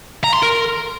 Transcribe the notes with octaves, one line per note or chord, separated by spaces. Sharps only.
A#5
C6
A#4